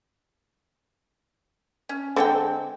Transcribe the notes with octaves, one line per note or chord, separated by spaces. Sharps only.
C#4
D3 G#3 C4 A4 F#5 G5